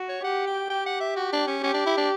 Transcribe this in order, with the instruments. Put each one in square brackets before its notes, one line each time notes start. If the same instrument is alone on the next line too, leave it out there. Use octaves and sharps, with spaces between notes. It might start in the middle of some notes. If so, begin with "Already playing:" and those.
Already playing: [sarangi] F#4
[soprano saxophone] C#5
[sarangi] G4 [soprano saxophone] F#5
[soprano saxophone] G5
[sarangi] G4 [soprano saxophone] G5
[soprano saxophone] F#5
E5
F#4
D4
C#4
[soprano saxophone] C#4 [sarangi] G4
[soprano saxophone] D4
E4
D4